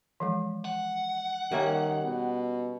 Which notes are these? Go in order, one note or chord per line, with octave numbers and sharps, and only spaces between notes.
E3 F3 G#3
F#5
D#3 G3 A#3 C#4 G4 C#5 E5
B2